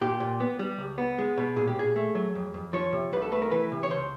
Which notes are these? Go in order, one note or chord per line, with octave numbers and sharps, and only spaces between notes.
A#2 G4
A#2
B3
G3
C#2
B3
G#3
B2
A#2 G#4
G4
A#2 G#4
A3
F#3
F2
F2
F3 C#5
C3
C2 B4
A4
A3 B4
A#4
E3 B4
C3
C#5
C#2 C5